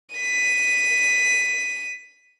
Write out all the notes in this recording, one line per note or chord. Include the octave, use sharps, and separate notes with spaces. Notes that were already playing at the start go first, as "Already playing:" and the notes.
B6 D#7